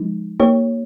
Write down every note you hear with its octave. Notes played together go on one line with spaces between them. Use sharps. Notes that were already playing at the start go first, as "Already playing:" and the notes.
Already playing: F3 G#3 D#4
A#3 D#4 G4 C#5